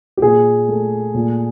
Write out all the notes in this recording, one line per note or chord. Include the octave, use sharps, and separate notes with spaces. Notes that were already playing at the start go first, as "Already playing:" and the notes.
G4
A#2 G#4
A3
A#2